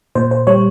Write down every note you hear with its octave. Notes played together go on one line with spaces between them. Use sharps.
A#2 C5
C5
G3 C#5